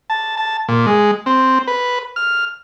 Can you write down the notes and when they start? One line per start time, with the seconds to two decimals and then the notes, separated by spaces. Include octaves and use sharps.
0.10 A5
0.37 A5
0.68 A#2
0.86 G#3
1.26 C4
1.67 B4
2.16 F6